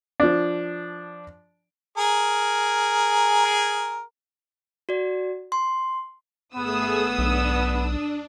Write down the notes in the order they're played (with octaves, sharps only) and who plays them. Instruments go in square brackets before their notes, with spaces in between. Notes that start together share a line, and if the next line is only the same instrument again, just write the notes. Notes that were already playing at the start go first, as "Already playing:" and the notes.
[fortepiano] F3 D4
[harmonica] G#4 A#4
[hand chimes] F#4 D5
C6
[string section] G#1 D#6 E6 [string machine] A3 G#4 [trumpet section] B3
[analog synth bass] B1 [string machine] D4